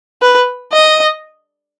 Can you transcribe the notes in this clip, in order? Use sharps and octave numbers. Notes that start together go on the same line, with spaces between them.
B4
D#5